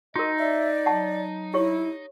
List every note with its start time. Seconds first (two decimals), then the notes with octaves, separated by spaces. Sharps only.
0.16 D#4 F#4 A#4 D#5
0.39 D5 E5
0.86 F#3 F#5 A5
1.54 E4 G4 C#5